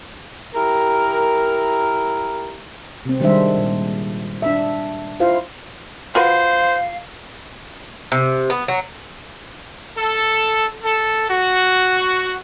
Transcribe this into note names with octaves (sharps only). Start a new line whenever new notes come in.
E4 G4 A#4
C3 C4
D#3 G3 G#3 D4 C5 E5
A#2
D4 E5
E4 F4 C5 F5
F4 F#4 B4 C5 F5
C3
B3
F#3
A4
A4
F#4